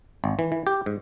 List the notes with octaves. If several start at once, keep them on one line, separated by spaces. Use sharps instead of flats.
G#1
E3
E3
G4
G#2